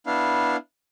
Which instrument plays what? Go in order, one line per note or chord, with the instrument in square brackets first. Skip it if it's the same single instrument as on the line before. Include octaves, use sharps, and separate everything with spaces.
[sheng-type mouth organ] B3 D4 E4 F5